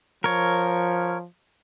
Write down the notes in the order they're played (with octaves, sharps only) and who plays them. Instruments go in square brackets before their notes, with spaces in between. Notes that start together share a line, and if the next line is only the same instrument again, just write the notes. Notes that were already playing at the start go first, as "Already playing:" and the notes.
[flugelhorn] F3 [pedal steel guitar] A#4 C#5